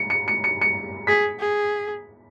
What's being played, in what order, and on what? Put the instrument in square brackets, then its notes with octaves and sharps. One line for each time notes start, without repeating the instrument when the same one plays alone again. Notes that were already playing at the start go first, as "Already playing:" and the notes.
Already playing: [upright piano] C#7
C#7
C#7
C#7
C#7
[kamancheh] G#4 [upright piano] B6
[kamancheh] G#4